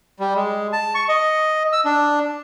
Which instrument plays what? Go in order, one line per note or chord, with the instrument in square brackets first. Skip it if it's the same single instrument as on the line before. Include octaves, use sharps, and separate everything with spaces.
[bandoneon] G3
G#3
A5
C#6
D#5
E6
D4